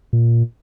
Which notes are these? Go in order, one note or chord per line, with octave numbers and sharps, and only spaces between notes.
A#2